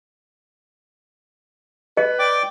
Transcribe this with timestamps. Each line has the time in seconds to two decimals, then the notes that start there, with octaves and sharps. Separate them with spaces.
1.97 B4 D#5
2.19 D5 G5 D6